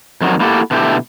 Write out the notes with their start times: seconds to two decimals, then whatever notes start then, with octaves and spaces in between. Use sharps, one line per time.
0.21 F2 D#3 F#3
0.40 A#3 E4 F#4 G4 A4
0.71 B2 D3 A3 E4 F#4 G4